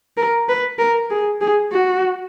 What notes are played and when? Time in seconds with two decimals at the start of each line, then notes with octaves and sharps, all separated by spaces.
0.17 A#4
0.49 B4
0.79 A#4
1.10 G#4
1.41 G#4
1.72 F#4